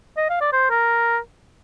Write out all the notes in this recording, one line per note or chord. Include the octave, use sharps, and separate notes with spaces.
D#5
F5
D5
C5
A#4